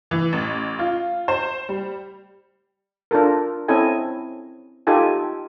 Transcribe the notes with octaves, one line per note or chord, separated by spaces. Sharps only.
E3
A1
F4
C5
G3
D4 F4 A4 A#4
C4 C#4 E4 A4 D#5 G#5
D#4 F4 G4 A4 G#5